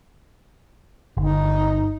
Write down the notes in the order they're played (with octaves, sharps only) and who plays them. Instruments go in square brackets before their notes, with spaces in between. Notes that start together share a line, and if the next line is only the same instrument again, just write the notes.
[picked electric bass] G1 [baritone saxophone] D#4